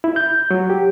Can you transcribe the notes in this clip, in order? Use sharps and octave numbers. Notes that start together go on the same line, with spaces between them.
E4
G6
F#3
G4